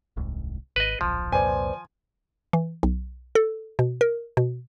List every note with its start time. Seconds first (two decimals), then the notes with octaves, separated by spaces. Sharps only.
0.17 D#1 C2 G#2
0.76 G#1 B4 D#5
1.01 D1 A#1 F3
1.32 C2 F2 A#2 B4 C5 D5 G#5
2.53 E3
2.83 B1
3.35 A4
3.79 B2
4.01 A#4
4.37 B2